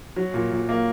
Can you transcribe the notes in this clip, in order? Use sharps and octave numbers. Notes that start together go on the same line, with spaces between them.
F#3
A#2
A#2
A#3